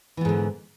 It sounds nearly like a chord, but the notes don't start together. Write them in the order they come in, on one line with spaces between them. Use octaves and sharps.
E3 B3 G#2 D3